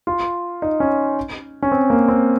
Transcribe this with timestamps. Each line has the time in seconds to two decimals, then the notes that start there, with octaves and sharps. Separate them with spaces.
0.07 F4
0.62 D#4
0.80 C#4
1.63 C#4
1.72 C4
1.90 A#3
2.08 C4